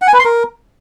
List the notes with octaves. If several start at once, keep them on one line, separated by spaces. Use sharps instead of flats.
F#5
G#5
B4
C6
A#4